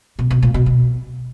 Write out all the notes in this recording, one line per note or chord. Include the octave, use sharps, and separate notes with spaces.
B2
B2
A#2
B2
B2